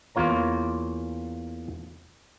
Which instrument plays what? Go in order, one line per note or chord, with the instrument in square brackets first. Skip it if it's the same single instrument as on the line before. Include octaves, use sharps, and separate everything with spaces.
[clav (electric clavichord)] E2 A#3 F4 C#5 A#5